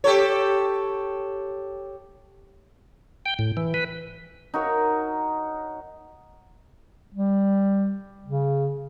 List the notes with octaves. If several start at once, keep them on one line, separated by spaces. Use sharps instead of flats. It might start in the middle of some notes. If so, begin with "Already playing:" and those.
G4 A4 C#5
G5
A2
E3
B4
D#4 F#4 A#4 C#5
G3
C#3